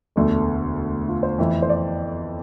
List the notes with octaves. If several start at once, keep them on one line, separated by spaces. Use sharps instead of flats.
E1 D2 D3 A3
A4
F4
C5
F2 E3 A3
C5
D5